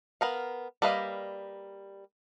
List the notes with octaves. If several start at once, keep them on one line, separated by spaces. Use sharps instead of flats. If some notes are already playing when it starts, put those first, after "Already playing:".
B3 A#4 F5
G3 A#3 B4 D#5 F5